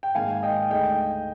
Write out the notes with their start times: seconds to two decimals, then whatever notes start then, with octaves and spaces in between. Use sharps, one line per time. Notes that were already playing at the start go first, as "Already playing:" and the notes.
0.03 G5
0.15 G#2 D#3 A#3 F5 G#5
0.43 D#5 G5
0.70 D2 D3 G#3 D#4 D#5 G5